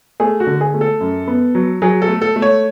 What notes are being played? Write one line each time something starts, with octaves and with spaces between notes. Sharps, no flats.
A3 G#4
F#4
D3
G#4
A3
A4
F#2
B3
F#3
F#3 G#4
A4
A3
A4
A3
C#5